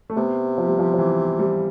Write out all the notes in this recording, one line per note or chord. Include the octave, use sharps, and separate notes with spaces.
A3
C3 B3
F3
G3
F3
F3
E3
G3